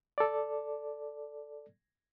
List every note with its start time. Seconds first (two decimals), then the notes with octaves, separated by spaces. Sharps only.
0.18 A4 D5